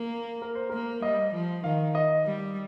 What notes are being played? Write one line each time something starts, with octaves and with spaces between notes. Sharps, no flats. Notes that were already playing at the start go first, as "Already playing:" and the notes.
Already playing: A#3
A#4
C5
A#3 A#4
G3 D#5
F3
D#3 F5
D#5
G3